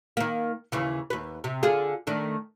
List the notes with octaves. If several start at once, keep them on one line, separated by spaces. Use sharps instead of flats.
D#3 A#3
D#2 C#3 E3
D#2 B4
C3
D3 F4 G#4
D#3 A3 D4